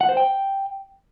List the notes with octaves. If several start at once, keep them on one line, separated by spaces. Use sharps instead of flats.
F#5
C5
G5